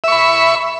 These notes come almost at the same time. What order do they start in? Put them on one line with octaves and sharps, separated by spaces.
E5 C#6 B5